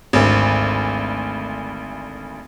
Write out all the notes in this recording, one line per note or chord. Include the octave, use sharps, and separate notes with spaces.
G#1 D2